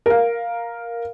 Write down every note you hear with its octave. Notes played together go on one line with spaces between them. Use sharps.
A#4 F5